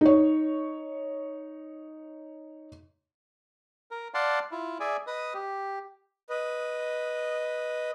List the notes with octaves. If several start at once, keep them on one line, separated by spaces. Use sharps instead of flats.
D#4 C#5
A#4
D5 F5 F#5 A5 C6
E4 F4
G#4 D5 E5 G#5
B4 D#5 D#6
G4
B4 D#5